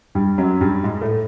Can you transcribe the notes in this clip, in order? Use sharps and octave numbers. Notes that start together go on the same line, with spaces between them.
G2 G3
F#2 F#3
G2 G3
G#2 G#3
A2 A3